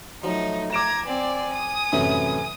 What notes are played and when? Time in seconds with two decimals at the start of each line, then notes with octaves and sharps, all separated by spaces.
0.24 F3 F#3 A3 D#4
0.73 A#5 D6 G#6 D7 E7
1.06 C4 D5 G#5
1.54 D#6
1.93 F#2 A2 C3 E3